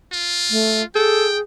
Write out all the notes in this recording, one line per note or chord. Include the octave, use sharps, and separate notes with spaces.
F4
A3
G#4 A4 G5